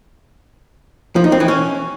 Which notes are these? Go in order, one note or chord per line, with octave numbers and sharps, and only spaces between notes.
F3
D#4
C4
E3
C#4